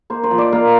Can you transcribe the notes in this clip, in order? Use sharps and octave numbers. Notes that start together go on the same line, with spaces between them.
A#3 C5
C5
F3
D5
A#3 F5